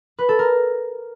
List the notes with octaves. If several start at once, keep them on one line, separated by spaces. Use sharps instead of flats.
B4
A4
A#4